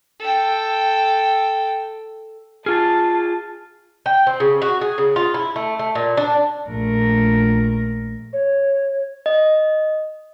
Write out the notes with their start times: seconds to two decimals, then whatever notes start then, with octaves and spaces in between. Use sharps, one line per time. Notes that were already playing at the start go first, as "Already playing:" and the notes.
0.19 A4 G5
2.66 F4 G#4 A5 F6 A6
4.06 G5
4.27 C4
4.40 C#3
4.62 F#4
4.81 G#4
4.98 C#3
5.16 F4
5.34 E4
5.56 A3
5.79 A3
5.95 A#2
6.17 D4
6.67 A#1 A3 A#4
8.33 C#5
9.26 D#5